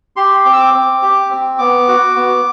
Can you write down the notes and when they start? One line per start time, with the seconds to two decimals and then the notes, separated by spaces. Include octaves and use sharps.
0.16 G4 C6
0.45 C4 D6
0.53 E6
0.59 D6
0.74 C4
1.02 G4
1.30 C4
1.59 B3 D6
1.88 F#4
2.16 B3